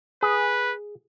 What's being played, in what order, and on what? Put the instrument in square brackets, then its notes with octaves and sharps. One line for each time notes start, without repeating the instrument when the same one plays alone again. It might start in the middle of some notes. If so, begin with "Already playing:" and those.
[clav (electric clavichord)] G#4 [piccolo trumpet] B4